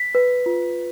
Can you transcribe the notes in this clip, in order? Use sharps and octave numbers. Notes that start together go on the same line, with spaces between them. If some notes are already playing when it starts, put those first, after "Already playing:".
Already playing: B6
B4
F4